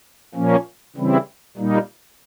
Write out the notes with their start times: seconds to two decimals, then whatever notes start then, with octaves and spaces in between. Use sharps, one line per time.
0.35 A#2 F3 A#3 C#4
0.96 C#3 E3 G3 C4 E4
1.57 A#2 G3 A#3 D#4